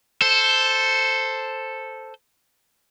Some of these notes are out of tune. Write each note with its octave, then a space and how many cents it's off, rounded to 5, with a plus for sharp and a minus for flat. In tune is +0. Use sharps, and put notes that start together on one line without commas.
A4 +0 C5 +0